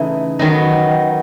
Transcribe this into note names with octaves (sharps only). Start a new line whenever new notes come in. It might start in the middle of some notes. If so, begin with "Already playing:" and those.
Already playing: C#3 E3 A3 D#4
D#3 F#3 B3 D#4